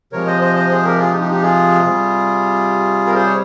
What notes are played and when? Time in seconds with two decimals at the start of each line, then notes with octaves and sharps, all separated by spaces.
0.12 C3 F3 G#3 A#4 C#5
0.27 C5 D#5
0.41 C5 D#5
0.56 C5 D#5
0.70 G#4 C5
0.85 G4 A#4
0.99 F4 G#4
1.09 D#4 G4
1.21 D#4 G4
1.31 D#4 G4
1.42 F4 G#4
1.85 C3 G3
3.07 A#4
3.15 G#4 C5
3.26 C#5